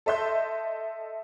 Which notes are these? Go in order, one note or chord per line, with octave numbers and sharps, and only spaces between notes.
A4 D#5 E5 C6 G6